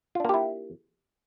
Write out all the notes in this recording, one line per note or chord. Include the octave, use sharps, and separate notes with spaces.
A#3 D4 E4 F4 G4